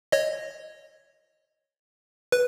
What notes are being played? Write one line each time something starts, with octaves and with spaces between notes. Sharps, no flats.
C#5 D#5
B4